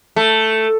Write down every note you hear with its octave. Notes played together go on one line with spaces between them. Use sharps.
A3